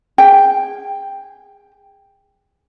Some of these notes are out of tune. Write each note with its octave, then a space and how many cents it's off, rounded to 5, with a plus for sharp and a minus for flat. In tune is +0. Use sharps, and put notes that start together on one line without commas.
G#4 -15 G5 +0